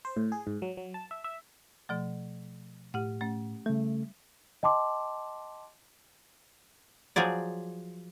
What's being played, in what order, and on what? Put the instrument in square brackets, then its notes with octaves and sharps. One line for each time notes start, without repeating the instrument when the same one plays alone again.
[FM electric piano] C5
A2
G#4
G#2
F#3
F#3
A5
E5
E5
[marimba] B2 F3 A3
[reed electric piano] A2 [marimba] G4 F#5
[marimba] A3 C#4
[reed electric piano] C#3 A3 [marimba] G3
[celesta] D#5 G5 A5 C6 D6
[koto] F3 F#3 G#4 D5